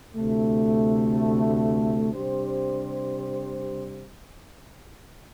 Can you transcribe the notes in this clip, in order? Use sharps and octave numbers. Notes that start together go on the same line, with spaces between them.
D2 C3 A3
C3 G3 D4 G4 C5